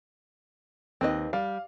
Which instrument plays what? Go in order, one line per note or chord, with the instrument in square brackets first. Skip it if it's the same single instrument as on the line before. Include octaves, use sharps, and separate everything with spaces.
[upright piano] D#2 [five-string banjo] C4 B4 D#5
[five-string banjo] G3 [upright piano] F5